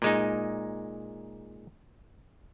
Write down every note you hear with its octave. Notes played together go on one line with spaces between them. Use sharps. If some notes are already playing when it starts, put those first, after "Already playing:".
A#2 G#3 D#4